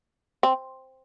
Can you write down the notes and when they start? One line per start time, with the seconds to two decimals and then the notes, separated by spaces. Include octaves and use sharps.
0.43 C4